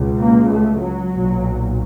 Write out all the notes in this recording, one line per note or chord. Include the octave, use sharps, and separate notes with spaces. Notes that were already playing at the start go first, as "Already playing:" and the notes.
Already playing: C#2 B2
A#3
A3
F#3
B1 A#2